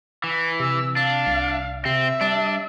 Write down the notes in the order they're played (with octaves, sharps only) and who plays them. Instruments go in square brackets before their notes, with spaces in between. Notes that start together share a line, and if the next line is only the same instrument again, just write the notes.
[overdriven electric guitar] E3
[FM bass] C3 [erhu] E6
[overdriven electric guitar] D4 [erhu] F5
[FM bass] C2
[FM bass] C3 [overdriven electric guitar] C4 [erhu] E5
[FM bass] G3 [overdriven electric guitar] D4